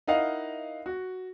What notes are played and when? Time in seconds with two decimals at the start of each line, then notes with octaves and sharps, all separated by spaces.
0.07 D#4 E4 A#4 D#5 F5 F#5
0.86 F#4